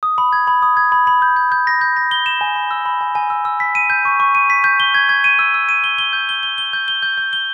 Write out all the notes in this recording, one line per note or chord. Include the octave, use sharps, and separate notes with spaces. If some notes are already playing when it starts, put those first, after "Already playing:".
D#6
B5
G#6
B5
D#6
G#6
B5
B5
G6
G6
G6
A#6
G6
A#6
G7
E7
G#5
B5
E6
B5
G#5
G#5
E6
E6
B6
D#7
G6
C#6
C#6
D#7
B6
G6
G7
G#6
G#6
D#7
E6
E6
D#7
G7
G7
G6
G7
G7
G7
G6
G7
G6
G6
G7